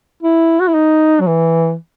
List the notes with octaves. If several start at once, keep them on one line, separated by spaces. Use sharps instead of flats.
E4
F#4
E4
D#4
F#3
E3